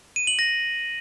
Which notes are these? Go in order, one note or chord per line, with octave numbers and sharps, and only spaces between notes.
D#7
F#7
A#6